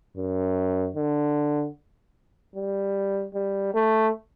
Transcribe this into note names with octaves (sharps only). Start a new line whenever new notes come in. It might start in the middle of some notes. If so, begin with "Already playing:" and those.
F#2
D3
G3
G3
A3